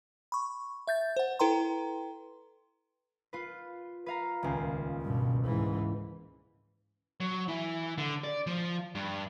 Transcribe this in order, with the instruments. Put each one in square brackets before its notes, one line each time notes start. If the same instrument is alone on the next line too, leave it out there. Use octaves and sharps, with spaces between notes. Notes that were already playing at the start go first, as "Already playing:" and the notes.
[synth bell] B5 C#6
E5 G6 A6
C5 F#5
E4 A4 B4 G5 A#5 C6
[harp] F4 B4
B4 F5 A#5
D#1 C#2
[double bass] G2 B2
G#2 E3
[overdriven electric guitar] F#3
E3
D3
D5
F3
G2